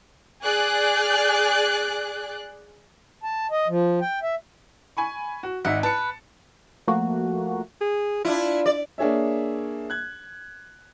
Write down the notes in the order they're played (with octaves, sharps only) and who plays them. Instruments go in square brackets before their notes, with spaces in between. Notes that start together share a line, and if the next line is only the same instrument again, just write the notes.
[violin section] G#4 D5 F#6
[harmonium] A5
D#5
F3
G5
E5
[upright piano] G#5 B5 C#6
F#4
[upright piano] G#1 D#4 E5 [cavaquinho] F#5
[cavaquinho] B4 [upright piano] A5 C#7
[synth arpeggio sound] F3 A3 A#3 F#4
[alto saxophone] G#4
[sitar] D4 E4 [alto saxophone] F4
[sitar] D5
[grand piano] A#3 D4 G#4 C#5 E5
F#6 G#6